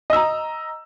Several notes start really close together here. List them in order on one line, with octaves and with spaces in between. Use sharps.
D#5 E6 A#5